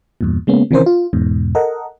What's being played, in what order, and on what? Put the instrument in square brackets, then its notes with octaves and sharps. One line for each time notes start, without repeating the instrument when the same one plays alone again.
[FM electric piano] E2 G2 A#2
C#3 G#3 A#3 B3 C#4
C3 D#3 E3 C#4 A#4 C5
F4
E2 G#2 B2
A4 A#4 D#5 F#5